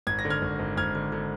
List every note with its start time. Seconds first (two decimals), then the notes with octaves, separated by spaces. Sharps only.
0.07 G#1 G#6
0.19 A#6
0.25 D3
0.30 F6 G#6
0.42 G#1
0.59 G#1
0.77 G#1 F6 G#6
0.95 D3
1.12 D3